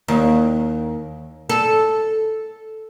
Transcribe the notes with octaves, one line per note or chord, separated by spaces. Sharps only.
D#2
A4